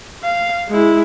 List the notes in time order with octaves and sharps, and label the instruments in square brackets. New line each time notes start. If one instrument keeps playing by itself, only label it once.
[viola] F5
G#3 E4